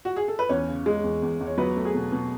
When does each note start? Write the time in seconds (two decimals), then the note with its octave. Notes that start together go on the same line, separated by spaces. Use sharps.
0.05 F#4
0.16 G#4
0.28 A4
0.39 B4
0.49 E2 C#4 C#5
0.68 C#3
0.86 G#3
1.04 E2
1.22 E2
1.40 E2
1.47 C#5
1.58 F#3 B3 B4
1.76 A3
1.85 G#4
1.95 B2
2.12 B2